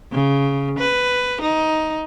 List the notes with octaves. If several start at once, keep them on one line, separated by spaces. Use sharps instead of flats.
C#3
B4
D#4